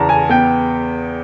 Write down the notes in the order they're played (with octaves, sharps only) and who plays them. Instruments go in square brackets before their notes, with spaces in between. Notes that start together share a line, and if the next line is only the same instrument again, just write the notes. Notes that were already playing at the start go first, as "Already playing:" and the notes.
Already playing: [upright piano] E2 C#3 A5 A#5
G#5
B3 G5